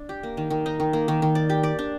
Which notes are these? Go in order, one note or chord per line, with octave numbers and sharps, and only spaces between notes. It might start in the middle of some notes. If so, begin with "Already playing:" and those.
Already playing: D4
G4
A#3
D#3
D#3
D#4
D#3
A#3
D#3
D#3
D5
G4
D5
D4